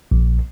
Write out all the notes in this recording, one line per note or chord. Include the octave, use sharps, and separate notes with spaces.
A#1